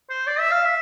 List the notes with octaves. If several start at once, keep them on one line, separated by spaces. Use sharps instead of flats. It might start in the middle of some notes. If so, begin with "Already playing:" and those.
C5
D5
E5
F5
E5